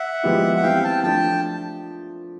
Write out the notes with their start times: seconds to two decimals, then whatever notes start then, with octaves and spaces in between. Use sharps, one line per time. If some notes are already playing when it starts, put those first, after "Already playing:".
Already playing: E5 F#5
0.23 F3 G#3 B3 E4 G4
0.57 F#5
0.63 E3 G3 C4 F5 G5
0.83 G5 A5
1.03 F3 A3 D4 G5 A5